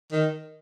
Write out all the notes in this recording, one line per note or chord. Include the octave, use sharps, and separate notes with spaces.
D#3